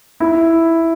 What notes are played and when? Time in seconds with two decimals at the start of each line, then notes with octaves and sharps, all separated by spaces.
0.20 E4